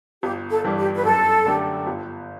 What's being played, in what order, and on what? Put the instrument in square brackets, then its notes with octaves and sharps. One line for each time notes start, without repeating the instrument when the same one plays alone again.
[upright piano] G1 [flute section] G4
[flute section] A4
[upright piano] G2 E3 G3
[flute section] G4
B4
[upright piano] F#2 [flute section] A4
[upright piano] D3 A3 D4 G4
G1